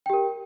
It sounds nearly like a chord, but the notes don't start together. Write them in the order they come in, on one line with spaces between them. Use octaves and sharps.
G5 G4 A#4